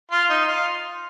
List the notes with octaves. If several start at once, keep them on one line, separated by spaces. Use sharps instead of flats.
F4
D#4
F4